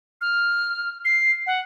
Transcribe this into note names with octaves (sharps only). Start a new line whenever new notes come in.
F6
C7
F#5